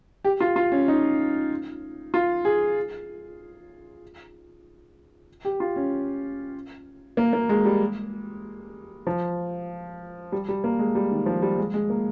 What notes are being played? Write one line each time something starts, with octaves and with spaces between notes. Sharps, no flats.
G4
F4
F4
C#4
D#4
F4
G#4
G4
F4
C#4
A#3
A#3
G#3
G3
F3
G3
G3
A#3
G#3
G3
D#3
F3
G3
G#3
G#3
A#3